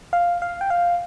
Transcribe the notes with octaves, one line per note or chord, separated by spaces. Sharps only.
F5
F5
G5
F5